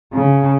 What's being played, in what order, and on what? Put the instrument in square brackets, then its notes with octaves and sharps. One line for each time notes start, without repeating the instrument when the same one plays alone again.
[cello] C#3